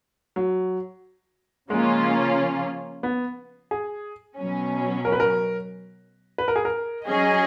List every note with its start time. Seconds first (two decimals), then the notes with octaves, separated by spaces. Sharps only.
0.36 F#3
1.70 C#3 F3 G#3 A#3 C#4 F4
3.03 B3
3.71 G#4
4.37 B2 F#3 C#4
5.05 A#4
5.12 B4
5.20 A#4
6.38 B4
6.48 A#4
6.56 G#4
6.65 A#4
7.05 F#3 C#4 G#4 D#5